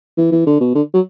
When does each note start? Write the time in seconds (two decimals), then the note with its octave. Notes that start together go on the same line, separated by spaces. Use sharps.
0.17 E3
0.32 E3
0.47 D3
0.60 B2
0.75 D3
0.94 F#3